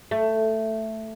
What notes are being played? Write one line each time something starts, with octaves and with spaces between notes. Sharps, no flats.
A3